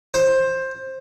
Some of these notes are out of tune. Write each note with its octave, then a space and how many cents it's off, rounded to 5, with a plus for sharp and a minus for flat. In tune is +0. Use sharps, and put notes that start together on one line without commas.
C5 +15